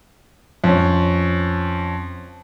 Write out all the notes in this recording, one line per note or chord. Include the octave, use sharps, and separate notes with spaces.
F2 C#4